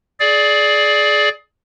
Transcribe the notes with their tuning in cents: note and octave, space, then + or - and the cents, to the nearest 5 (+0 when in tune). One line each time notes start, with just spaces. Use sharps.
G#4 +25 D5 +0